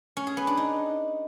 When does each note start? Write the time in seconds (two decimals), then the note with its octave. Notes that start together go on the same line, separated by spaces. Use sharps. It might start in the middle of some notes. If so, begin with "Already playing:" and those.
0.17 C#4
0.27 G#4
0.37 B3
0.47 D4
0.57 D#4